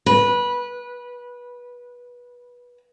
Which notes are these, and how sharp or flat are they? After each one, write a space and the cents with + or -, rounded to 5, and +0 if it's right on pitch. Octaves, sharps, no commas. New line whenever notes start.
B4 -20